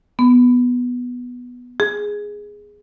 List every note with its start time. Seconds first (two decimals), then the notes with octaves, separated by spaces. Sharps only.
0.19 B3
1.80 G#4